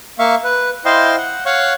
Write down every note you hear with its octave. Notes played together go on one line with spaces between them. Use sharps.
A#3 E5 F5 C#6
B4
E4 C5 D#5 F5 G5 C6
F#5
C#5 F5 F#5 C#6